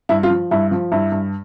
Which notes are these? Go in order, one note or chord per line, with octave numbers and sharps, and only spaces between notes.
G2 E4
F4
F3
G2 E4
F3
G2 E4
G2